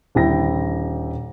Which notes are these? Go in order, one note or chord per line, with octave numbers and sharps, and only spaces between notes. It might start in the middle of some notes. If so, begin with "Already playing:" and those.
D#1 D3 E4 G5 A#6